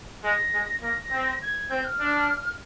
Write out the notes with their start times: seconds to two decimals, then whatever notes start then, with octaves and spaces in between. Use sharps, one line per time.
0.24 G#3 A#6
0.54 G#3
0.82 A#3 A#6
1.12 C4
1.42 G#6
1.70 C4 G6
1.85 F6
2.00 D4